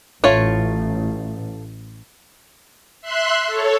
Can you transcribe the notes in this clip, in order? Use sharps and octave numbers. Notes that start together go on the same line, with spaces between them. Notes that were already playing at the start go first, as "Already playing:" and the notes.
A1 A3 F4 C#5
E5 C6 F#6
A4 C#5